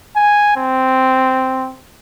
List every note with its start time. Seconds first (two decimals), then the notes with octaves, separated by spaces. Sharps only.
0.16 G#5
0.56 C4